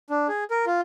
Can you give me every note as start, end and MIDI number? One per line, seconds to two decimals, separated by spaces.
0.10 0.28 62
0.28 0.44 68
0.51 0.65 70
0.66 0.81 65